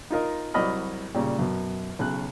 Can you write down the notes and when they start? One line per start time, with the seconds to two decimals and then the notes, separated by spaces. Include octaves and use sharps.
0.11 D#4 F4 A#4 D#5
0.54 C2 F#3 D5 D#5 B5 F6
1.14 A#2 C#3 G3
1.39 F#2 B2
1.99 B1 C#3 F#6